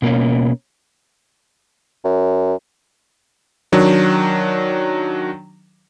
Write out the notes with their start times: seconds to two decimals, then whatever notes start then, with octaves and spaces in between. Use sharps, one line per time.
0.02 B2 A#3 C#4
2.04 F#2
3.72 D#3 F#3 D4